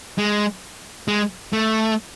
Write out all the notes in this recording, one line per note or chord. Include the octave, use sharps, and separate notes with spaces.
G#3
G#3
A3